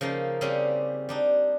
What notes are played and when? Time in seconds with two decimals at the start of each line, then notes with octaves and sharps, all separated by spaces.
0.01 C#3 F3 A#3 D#4
0.41 C#3 G3 C4 C#4 G4
1.09 G3 D4 D#4